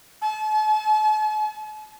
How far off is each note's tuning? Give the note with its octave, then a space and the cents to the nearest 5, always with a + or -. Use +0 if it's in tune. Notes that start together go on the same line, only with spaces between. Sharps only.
A5 -45